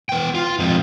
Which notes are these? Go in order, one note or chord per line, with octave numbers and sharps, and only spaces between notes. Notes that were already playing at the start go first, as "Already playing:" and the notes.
B3 G5
F4
F2 G#2